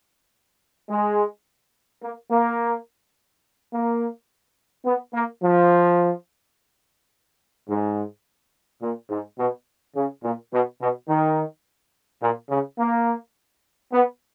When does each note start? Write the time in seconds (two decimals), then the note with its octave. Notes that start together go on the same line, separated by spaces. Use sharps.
0.89 G#3
2.02 A#3
2.30 A#3
3.73 A#3
4.85 B3
5.14 A#3
5.43 F3
7.68 G#2
8.82 A#2
9.11 G#2
9.39 B2
9.96 C#3
10.23 A#2
10.52 B2
10.80 B2
11.08 D#3
12.22 A#2
12.50 C#3
12.79 A#3
13.92 B3